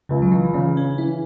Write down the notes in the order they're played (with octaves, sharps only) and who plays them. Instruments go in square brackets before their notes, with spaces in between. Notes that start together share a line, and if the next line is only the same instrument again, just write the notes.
[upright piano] C#2 [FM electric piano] C#3
[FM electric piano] F#3
E3
[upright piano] C#3 [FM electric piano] E3
[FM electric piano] C#4
C#4
[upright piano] E3 [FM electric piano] E4